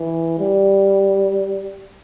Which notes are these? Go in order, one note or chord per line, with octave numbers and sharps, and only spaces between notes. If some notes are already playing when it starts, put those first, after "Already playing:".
Already playing: E3
G3